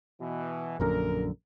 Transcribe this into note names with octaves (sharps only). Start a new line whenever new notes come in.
B2 E3
A#1 F#2 D3 A#3 A#4